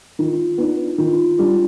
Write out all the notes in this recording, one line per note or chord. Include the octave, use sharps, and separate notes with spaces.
D#3 F4
B3 D4 D#4
D#3 F4
G3 D4 F4